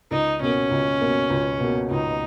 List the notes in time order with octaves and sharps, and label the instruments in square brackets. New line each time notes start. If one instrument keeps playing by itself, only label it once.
[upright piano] C#2 [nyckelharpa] D#4
[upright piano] B2 A#3 [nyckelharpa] C#4
[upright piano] C#2
B2 A#3
C#2
B2 A#3
[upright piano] C#2 [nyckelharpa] D#4